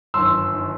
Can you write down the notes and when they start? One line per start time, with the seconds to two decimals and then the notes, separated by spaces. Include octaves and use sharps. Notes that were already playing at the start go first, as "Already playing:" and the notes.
0.14 G1 F#2 D#3 C6 E6
0.54 D#3